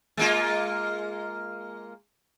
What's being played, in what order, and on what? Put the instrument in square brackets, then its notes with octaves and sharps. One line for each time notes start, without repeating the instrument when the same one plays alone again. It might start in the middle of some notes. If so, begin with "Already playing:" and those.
[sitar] G#3 A#3 F4